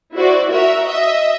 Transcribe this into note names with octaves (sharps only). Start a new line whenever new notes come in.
E4 F#4 C5 D5
F#4 A#4 E5
D#5 E5